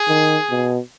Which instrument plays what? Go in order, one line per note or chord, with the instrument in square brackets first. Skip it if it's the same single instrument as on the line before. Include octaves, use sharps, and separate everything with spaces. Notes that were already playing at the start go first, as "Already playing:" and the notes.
Already playing: [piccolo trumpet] G#4
[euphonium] D#3
B2